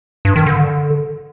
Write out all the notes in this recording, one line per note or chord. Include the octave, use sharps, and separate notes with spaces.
G2
D#3
D3